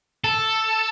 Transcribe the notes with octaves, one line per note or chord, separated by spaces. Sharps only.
A4